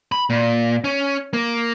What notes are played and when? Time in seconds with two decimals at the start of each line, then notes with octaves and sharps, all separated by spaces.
0.12 B5
0.30 A#2
0.84 C#4
1.33 A#3